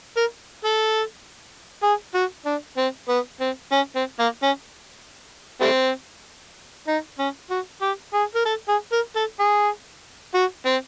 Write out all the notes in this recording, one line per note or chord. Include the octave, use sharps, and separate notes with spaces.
A#4
A4
G#4
F#4
D4
C4
B3
C4
C#4
C4
A#3
C#4
G3 A3 C4
D#4
C#4
F#4
G4
G#4
A#4
A4
G#4
A#4
A4
G#4
F#4
C4